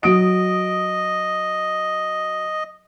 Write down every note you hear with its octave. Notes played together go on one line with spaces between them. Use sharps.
F#3 D#5 D#6 D7